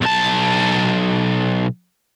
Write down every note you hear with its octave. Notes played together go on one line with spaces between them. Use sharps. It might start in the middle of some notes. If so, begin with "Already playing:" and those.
B1 A5